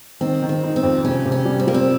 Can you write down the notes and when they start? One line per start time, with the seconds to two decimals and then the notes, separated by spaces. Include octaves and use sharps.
0.21 D#3 C4
0.42 D#3
0.49 C4
0.63 D#4
0.76 C4
0.83 F2
1.05 C3 C#4
1.25 C3
1.32 C#4
1.45 G3
1.60 C4
1.67 G3 A#3
1.74 C4